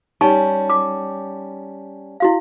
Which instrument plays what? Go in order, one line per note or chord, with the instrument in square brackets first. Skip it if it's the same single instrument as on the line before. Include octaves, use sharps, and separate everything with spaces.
[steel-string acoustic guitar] G3 C#4 [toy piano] D#4 G#5 C#6 [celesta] A5
[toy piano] D6
E4 F#4 F5